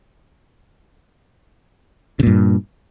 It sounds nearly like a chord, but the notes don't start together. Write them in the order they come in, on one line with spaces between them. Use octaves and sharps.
C#3 A#2 G2